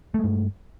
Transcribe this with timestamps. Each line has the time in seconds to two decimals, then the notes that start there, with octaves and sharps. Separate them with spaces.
0.14 A3
0.19 G#3
0.24 G2